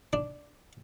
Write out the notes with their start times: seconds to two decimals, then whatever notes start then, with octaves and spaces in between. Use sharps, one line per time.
0.13 D4